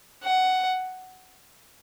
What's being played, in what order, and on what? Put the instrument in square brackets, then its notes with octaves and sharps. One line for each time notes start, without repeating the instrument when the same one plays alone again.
[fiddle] F#5